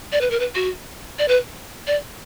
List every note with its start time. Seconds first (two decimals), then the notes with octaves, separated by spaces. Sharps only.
0.12 D5
0.21 B4
0.31 A#4
0.40 B4
0.55 F#4
1.19 D5
1.28 B4
1.87 D5